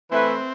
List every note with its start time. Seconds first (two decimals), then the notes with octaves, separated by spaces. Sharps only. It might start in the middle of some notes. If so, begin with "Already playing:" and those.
0.11 E3 A3 C4 E4 B4